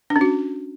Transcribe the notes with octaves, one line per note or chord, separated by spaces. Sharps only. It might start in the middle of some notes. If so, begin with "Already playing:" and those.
D4
C#4
F#4